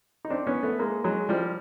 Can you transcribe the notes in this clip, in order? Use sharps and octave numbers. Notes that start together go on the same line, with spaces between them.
D#4
C4 D4
B3 C#4
A3 B3
G#3 A#3
F#3 G#3
F3 G3